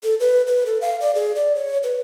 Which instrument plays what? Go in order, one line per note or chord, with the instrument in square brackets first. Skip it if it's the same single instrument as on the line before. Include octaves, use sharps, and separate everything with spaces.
[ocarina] A4
B4
B4
A4
F5
D5
G#4
D5
C#5
B4